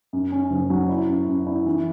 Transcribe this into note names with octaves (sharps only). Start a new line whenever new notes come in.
F#2
C#4
F#1
F#3
E4
F#2
F#2
E4
E3